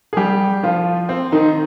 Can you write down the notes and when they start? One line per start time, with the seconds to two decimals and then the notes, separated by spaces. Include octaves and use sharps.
0.13 G#4
0.17 G3 G4
0.63 F3 F4
1.09 C4
1.32 D#3 D#4